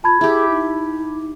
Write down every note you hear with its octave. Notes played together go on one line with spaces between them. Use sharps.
F4 A5 B5 G#6
E4 G4 G#4
D#4